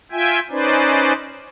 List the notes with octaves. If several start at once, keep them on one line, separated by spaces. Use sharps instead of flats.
F4 E5 G5 G#5
C#4 D#4 B4 C5 D5